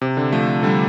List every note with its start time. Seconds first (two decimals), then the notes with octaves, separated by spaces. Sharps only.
0.01 C3
0.17 D3
0.32 F3 A3
0.63 D3 G3